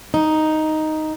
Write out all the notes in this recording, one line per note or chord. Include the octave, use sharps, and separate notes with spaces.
D#4